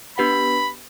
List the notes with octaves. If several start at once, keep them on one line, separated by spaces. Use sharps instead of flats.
B3 D4 G4 B4 F#5 B5